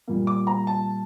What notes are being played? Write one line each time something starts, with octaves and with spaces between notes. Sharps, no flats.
A#2 G3 A#3
D6
A#5
A5